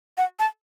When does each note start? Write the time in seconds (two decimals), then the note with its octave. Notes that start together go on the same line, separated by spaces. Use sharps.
0.18 F#5
0.39 A5